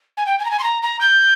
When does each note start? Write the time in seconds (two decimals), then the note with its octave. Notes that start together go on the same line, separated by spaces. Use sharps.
0.17 G#5
0.26 G5
0.39 G#5
0.45 A#5
0.51 G#5
0.59 C6
0.63 A#5
0.82 A#5
1.01 G6